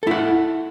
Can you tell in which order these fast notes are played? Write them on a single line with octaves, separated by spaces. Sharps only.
A4 E4 F#5